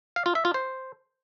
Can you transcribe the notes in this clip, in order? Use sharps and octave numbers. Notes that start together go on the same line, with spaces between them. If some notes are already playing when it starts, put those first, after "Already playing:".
F5
F4
E5
F4
C5